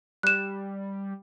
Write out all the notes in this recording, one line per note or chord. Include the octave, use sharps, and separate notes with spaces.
G3 F#6 E7